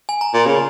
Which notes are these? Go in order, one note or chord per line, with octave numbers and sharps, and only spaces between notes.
G#5
A#5
A#2
C#3